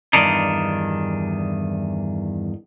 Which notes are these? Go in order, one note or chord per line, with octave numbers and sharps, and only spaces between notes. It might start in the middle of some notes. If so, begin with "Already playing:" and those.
E2 G2 D#3 D4 D#4